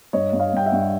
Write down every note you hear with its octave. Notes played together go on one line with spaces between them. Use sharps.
G2 C#5 D#5
G2
D#5 F5
G2 G5
E5 F#5
G2